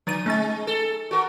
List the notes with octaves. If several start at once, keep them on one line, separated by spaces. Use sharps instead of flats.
D3 F#3 D5 D#7
G#3 A3 C#4 A6
A4
F#4 A4 A#4